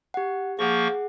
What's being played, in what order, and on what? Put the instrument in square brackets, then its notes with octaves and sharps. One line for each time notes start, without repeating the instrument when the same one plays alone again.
[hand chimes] G4 F#5
[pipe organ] F3 A#3 C#6 [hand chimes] G#4 F#5